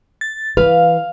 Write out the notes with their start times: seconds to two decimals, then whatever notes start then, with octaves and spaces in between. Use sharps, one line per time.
0.21 A6
0.57 E3 B4 F5